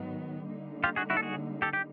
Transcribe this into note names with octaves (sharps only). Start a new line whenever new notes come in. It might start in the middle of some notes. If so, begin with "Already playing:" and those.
Already playing: G#2 D#3 F#3 B3
D3 G3 A#3 D#4
F4 G4
F#4 G#4
E4 F#4
A4
F#4 G#4
G4 A4
G4